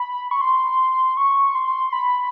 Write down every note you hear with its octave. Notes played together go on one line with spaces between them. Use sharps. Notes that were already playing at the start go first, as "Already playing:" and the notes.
Already playing: B5
C#6
C6
C#6
C6
C6
B5